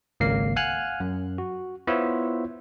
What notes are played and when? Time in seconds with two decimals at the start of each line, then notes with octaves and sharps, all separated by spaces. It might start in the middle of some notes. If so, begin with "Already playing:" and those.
0.20 G#1 C#2 A#3 F5 C7
0.56 F5 F#5 G#5 F6 F#6
1.00 F#2
1.38 F#4
1.87 B3 E4 F4 C5 C#5 E5